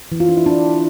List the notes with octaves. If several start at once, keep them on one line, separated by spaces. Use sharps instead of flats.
E3
F4
D4
E4
D4